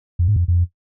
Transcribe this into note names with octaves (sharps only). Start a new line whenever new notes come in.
F2
G#2
F2
F2